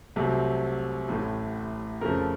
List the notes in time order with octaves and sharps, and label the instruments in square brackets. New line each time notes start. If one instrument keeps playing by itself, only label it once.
[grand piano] C2 C3 F#3 A3
A1 A2 A3
F2 C#3 F3 A3 A#4